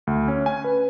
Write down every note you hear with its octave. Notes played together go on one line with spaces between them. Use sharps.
D2
C#4
G#5
B4